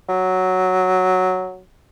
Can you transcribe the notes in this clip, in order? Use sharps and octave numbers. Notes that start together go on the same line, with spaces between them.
F#3